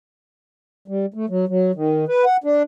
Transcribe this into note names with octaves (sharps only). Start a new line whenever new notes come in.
G3
A3
F#3
F#3
D#3
B4
F#5
D4